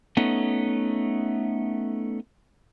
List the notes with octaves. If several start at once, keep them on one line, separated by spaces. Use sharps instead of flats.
A3 B3 C#4 D#4